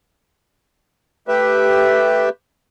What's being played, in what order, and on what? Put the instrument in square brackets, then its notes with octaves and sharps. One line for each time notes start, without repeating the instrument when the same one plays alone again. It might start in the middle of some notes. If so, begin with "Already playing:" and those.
[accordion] A3 G4 B4 E5